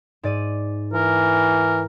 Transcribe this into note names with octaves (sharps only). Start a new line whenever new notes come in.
G#2 D5 D#7
E3 A#4